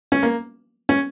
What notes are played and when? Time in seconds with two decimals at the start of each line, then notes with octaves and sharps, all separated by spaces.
0.12 C#4
0.23 A#3
0.89 C#4